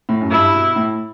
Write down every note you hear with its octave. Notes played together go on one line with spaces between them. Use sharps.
A2
F#2
G2 E4
B2
A2